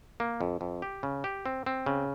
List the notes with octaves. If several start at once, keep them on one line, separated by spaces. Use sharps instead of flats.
A#3
F2
F2
G4
C#3
G4
C4
C4
C#3